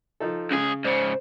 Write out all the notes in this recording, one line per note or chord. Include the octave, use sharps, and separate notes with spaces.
F3 D#4 A4
C#2 C#3 G#4
G#2 C#3 C5 D5